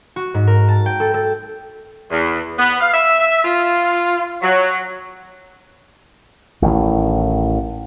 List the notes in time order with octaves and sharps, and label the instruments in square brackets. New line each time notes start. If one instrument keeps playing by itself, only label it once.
[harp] F#4
G#2
A#4
A5
G5
A4
A4
[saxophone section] E2
B3
F5
E5
F4
F#3
[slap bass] A1 A2 D#3